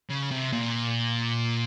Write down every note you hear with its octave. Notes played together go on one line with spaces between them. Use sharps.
C#3
C3
A#2